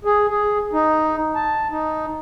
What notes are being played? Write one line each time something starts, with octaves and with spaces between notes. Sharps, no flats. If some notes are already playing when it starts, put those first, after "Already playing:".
G#4
G#4
D#4
A5
D#4